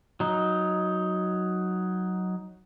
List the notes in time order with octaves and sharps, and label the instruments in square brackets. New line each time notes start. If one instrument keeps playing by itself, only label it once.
[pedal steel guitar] F#3 D#4